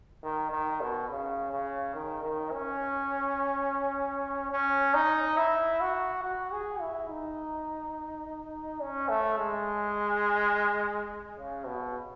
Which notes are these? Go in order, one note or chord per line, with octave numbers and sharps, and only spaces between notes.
D#3
D#3
B2
C#3
C#3
D#3
D#3
C#4
C#4
D#4
E4
F#4
F#4
G#4
E4
D#4
C#4
A3
G#3
C#3
B2